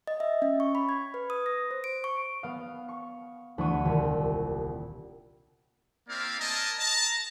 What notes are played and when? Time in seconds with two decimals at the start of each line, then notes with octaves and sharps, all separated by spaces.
0.07 D#5
0.20 E5
0.42 C#4
0.60 C#6
0.75 B5
0.89 G#6
1.14 B4
1.30 D#6
1.46 A#6
1.71 C5
1.84 D7
2.04 C#6
2.43 B3 F5 D#6
2.88 C#6 C#7
3.58 D2 E3 B3 E4 C#6 D#7
3.85 D#1 C2
6.08 A#3 C4 E4 D5 F5
6.40 A#4 D#5 G#5 A5
6.80 A5 A#5